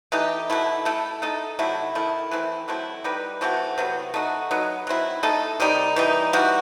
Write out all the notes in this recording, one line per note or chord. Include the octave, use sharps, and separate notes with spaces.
E3 A3 D#4 G4
B2 A3 E4
A3 E4 A4
A3 D#4 A4
C3 F#3 A3 E4
D#3 A3 E4
E3 A3 C4 E4
F#3 A3 C4 E4
G3 D#4 G4 B4
E3 A3 C4 F#4
C3 F#3 B3
A3 D#4 F#4
F#3 B3 D#4
F#3 C4 E4
A3 D#4 A4
C3 D#3 G3 D#4
E3 G3 D#4
E3 G3 D#4 F#4